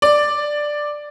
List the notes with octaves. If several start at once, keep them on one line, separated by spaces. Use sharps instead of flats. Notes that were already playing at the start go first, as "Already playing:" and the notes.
D5